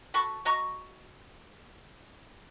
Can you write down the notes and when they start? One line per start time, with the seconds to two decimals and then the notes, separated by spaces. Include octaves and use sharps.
0.14 F#4 A4 B5 C#6
0.45 F#4 D#5 A#5 C#6